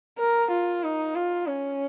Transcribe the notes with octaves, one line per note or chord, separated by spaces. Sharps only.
A#4
F4
D#4
F4
C#4